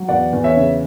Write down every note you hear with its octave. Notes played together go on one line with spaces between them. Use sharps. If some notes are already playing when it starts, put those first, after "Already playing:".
Already playing: F#3
E2 D5 F#5
E2
C#5 E5
C#3